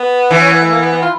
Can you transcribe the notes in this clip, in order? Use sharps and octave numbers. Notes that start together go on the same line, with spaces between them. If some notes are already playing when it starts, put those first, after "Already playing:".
Already playing: B3
E3
C#4
B3
A3
A#3
B3
B3
F4